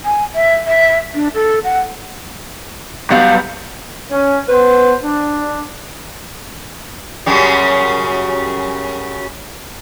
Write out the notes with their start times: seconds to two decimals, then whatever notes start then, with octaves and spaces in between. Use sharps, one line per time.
0.05 G#5
0.35 E5
0.67 E5
1.15 D4
1.34 A4
1.64 F#5
3.10 G2 F#3 G3 B3 F5
4.10 C#4
4.49 B3 B4 C5
5.03 D4
7.26 F#2 C#3 G3